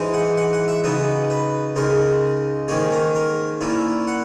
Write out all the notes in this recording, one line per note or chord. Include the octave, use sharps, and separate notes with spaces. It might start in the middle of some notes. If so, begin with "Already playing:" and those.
Already playing: G#2 E3 G#3 D#4
F#5
F#5
F#5
E5
C#3 F#3 B3 D#4 B4
B4
C#2 C#3 G#3 D#4 A#4
G#2 D#3 A#3 C#4 G#4
A#4
A#4
A#2 A#3 C#4 E4
F#5